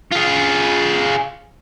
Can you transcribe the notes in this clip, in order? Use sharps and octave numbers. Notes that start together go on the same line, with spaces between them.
F4 G#4